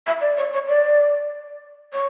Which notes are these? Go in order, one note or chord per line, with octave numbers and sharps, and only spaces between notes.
E5
D5
C#5
C#5
D5
C#5